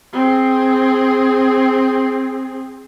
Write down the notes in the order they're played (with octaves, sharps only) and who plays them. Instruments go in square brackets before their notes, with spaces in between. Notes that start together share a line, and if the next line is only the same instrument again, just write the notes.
[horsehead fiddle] C4 G#4